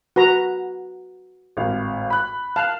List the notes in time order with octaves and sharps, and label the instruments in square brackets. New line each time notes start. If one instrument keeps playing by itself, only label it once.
[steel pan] F#4 B4 A#5
[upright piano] G#1 A2 F5
B5 F#6
[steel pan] F5 [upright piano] A5 F#6